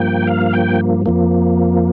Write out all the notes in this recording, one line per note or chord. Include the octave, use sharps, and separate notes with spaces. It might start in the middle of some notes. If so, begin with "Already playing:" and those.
Already playing: G2 F3 A#3 G5
F5
G5
F2 F3 A#3